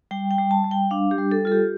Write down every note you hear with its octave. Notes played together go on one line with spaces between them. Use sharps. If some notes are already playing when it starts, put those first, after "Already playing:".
G3 G5
G5
G3
A5
G3
G5
D4 F5
G4
G3
A4
F4 A4
G4